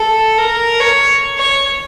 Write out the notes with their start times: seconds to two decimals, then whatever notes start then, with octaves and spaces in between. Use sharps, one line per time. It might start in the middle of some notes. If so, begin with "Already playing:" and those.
Already playing: A4
0.37 A#4
0.80 C#5
1.38 C#5